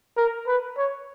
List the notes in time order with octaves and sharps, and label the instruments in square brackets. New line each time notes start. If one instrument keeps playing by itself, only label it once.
[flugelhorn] A#4
B4
C#5